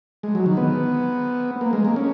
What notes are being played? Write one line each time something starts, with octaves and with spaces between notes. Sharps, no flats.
G#3
F#3
D#3
B3
A#3
G#3
A#3
C#4